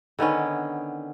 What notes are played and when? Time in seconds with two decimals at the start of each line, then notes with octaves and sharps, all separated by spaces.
0.19 D3 D#3 B3 C#4